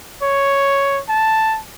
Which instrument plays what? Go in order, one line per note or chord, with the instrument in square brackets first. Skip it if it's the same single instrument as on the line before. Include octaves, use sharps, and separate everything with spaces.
[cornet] C#5
A5